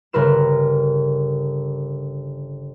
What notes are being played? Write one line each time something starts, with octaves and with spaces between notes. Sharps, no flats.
G1 C#3 A#4 B4 E7